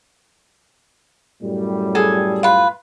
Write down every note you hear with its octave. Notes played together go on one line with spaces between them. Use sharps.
F#2 A2 G3
G#4 A4 G#5
F4 B4